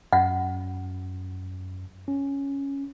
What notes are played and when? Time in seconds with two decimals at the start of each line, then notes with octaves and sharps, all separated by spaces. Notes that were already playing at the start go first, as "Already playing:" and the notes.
0.13 F#2 F#5
2.08 C#4